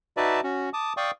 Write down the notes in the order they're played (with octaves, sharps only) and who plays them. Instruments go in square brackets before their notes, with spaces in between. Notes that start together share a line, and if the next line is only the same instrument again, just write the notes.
[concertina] D#4 F#4 B4 D5 E5 A5
C#4 F#4
A5 D6 D#6
D5 F5 G5 C#6 D#6